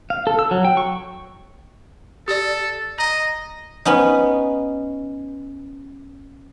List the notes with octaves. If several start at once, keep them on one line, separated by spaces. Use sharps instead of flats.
F5
A4
E6
F#3
G5
C#6
G4 A4 D5
D#5 A#5
B3 C#4 D#4